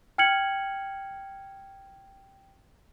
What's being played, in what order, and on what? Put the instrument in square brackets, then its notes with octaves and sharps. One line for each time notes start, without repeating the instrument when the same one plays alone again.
[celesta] G5 F6 G#6 C#7 F#7